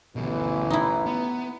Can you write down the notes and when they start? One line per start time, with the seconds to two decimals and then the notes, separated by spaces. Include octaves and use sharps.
0.16 A1 D2 B2 E3
0.70 D#4 E4
1.06 B3